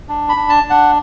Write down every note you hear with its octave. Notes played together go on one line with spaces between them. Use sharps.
D4
B5
D4
A5
D4
F#5